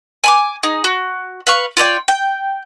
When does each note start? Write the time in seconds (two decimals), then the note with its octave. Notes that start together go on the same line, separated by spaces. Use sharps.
0.24 G#5 B5 D6
0.63 D#4 G#4
0.84 F#4
1.47 B4 F5 C#6
1.77 F4 C#5 D5 G5
2.08 G5